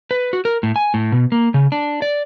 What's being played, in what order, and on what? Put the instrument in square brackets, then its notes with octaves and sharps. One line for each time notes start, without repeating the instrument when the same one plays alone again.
[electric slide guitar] B4
F#4
A#4
A2
G#5
A2
B2
A#3
C#3
D4
D5